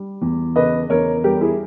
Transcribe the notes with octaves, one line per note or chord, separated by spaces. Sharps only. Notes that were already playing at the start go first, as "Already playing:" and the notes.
Already playing: G3
E2
C#3 B4 D#5
E2 A#4 C#5
G3 G4 A#4
E4 G#4